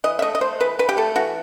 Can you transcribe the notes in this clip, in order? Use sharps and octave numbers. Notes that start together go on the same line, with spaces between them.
E3 D#5
E5
A3 D#5
D#5
A3 C5
E3 B4
E3 B4
G4
A3 A4
E3 F#4